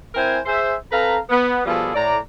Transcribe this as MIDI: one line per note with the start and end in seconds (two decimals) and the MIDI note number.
0.14 0.38 60
0.14 0.38 64
0.14 0.38 70
0.14 0.38 72
0.14 0.38 80
0.46 0.74 68
0.46 0.74 72
0.46 0.74 76
0.91 1.18 60
0.91 1.18 69
0.91 1.18 71
0.91 1.18 77
0.91 1.18 82
1.30 1.62 59
1.65 1.90 47
1.65 1.90 53
1.65 1.90 55
1.65 1.90 65
1.65 1.90 68
1.65 1.90 69
1.95 2.18 45
1.95 2.18 74
1.95 2.18 82